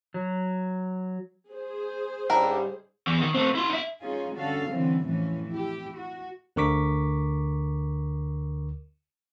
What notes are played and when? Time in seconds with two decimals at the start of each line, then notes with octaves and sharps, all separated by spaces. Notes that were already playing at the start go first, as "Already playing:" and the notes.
0.14 F#3
1.49 G#4 C5
2.30 G#2 C#3 G3 D4 E4 A#4
3.07 E2
3.21 D#3
3.34 A3 C4
3.55 E4 C6
3.70 D#4 E5
4.02 G#3 C#4 D#4 F4 G#4
4.35 D3 G3 C#4 F#4 A4 F5
4.71 D3 E3 G3 C4 C#4
5.06 F2 A2 E3 F3 C#4
5.48 E4 G4
5.97 F#4
6.56 D2 D3 A#4 C#6 D6 B6